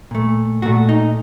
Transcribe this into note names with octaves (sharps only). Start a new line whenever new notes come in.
A#2 A3
A#2 A3 F#4
D#4